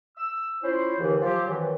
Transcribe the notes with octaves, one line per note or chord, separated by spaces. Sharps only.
E6
C#4 E4 F4 C5
D#2 D3 E3
F3 F#3 G4
F#2 D#3 E3